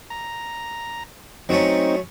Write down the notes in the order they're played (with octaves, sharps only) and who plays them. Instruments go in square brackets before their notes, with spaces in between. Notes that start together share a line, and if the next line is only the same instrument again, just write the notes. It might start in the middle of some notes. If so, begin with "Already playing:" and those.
[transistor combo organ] A#5
[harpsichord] F#3 A3 C#4 [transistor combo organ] C4 D#4